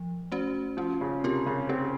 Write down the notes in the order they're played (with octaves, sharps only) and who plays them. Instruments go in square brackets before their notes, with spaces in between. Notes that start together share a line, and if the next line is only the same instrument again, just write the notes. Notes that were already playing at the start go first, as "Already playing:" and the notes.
Already playing: [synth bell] F3
A3 C#4 F#4 C5
[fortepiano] F3 [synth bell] C#4
[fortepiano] C#3
[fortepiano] C3 [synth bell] F4 A#4
[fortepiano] C#3
[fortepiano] C4 [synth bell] C#4